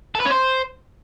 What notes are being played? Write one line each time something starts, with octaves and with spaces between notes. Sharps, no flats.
A4
B4
C#4
C5